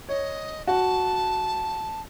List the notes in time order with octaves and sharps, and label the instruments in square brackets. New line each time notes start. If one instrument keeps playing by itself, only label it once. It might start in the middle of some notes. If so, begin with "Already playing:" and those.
[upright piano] C#5 [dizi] D#5
[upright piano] F#4 [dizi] A5